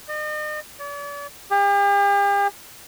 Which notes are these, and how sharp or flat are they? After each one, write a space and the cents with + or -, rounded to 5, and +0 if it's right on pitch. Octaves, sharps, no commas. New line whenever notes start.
D#5 -40
D5 -45
G4 +45